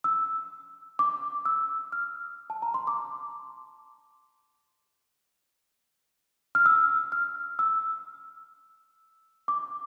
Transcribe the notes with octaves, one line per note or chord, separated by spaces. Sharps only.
E6
D6
E6
F6
A5
A#5
C6
D6
F6
E6
F6
E6
D6